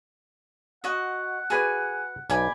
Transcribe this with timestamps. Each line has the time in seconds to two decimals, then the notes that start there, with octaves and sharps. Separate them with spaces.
0.84 F#4 D#5 F#5
1.50 F#4 G#4 B4 D5 G#5
2.30 B1 D5 G#5 B5